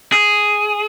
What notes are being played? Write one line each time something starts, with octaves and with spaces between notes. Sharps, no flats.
G#4